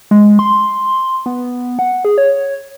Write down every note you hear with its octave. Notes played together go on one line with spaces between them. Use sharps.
G#3
C6
B3
F#5
G#4
C#5